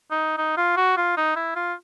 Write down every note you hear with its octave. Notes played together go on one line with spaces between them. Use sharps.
D#4
D#4
F4
F#4
F4
D#4
E4
F4